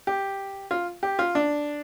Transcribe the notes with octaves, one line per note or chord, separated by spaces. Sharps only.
G4
F4
G4
F4
D4